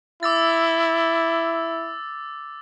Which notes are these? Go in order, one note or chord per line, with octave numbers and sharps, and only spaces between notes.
E4 D6 E6 A6